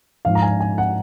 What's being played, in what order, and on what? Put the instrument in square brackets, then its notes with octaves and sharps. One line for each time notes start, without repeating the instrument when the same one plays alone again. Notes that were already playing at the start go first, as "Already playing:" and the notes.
[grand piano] G#2 F3 F5
A#5
G#5
G#5
F#5